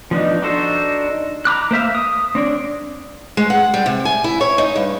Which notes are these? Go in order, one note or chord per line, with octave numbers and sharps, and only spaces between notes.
F3 B3 D4 D#4
D4 D#4 F#4 A4 C5
A#5 B5 D6 F#6
A#3 C5 E5 F5
D#6
C4 D4 C#5
G#3
F#5
G3
C3
G#5
E4
C#5
D#4
G2